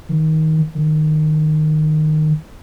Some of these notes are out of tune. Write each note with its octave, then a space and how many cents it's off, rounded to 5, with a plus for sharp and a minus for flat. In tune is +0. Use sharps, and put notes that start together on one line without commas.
D#3 +20
D#3 -15